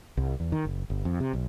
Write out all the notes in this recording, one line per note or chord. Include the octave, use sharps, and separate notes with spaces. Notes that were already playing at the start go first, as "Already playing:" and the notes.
C2
E2
D#3
F#1
G1
F2
C3
B1